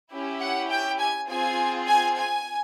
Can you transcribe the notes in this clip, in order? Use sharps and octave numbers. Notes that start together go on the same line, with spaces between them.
C#4 E4 G4
F#5
G5
G#5
C4 F4 G#4 G#5
G#5
G#5